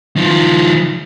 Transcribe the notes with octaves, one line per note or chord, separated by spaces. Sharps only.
D#3 F3